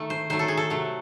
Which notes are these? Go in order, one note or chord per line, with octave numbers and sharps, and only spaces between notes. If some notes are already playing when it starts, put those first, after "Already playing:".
Already playing: D#3 A3 A4
C5
D#3 F#3 A3 C5
A4
G#4
A4
C3 F#3 A3